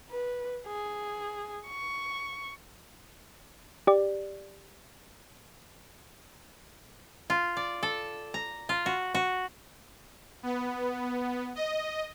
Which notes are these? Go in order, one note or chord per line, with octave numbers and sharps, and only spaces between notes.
B4
G#4
C#6
G4 D5
F4
D5
A4
A#5
F4
F#4
F#4
B3
D#5